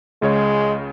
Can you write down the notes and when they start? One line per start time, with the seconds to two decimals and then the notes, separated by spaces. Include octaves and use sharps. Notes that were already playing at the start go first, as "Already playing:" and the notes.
0.22 C#2 C#3 G#3 C#5